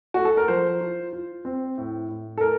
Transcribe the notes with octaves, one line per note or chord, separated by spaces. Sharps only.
A3 F#4
A4
A#4
F3 C5
F4
F4
C4
A2
A2
A4
A3 A#4